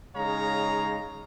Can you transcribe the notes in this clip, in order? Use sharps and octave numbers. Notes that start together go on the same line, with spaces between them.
C#3 G#3 D#4 C#5 F5 A#5